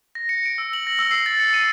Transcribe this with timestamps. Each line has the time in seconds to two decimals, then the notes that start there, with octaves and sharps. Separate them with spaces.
0.15 A#6
0.29 C#7
0.46 D7
0.58 E6
0.73 F#7
0.87 A#6
0.99 E6
1.11 C7
1.26 A6
1.39 C#7
1.54 D#7